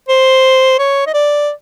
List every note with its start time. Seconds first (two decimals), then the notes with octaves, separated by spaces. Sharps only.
0.08 C5
0.79 C#5
1.06 D#5
1.14 D5